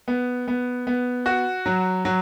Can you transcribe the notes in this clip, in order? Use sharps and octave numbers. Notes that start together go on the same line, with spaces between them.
B3
B3
B3
F#4
F#3
F#3